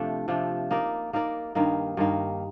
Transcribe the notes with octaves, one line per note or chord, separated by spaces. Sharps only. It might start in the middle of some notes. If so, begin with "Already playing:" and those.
Already playing: C3 F3 A3 D4
C3 F3 A3 D4
A#3 D#4 A#4 D5
A#3 D#4 A#4 D5
G2 D#3 A#3 D#4
G2 D#3 A#3 D#4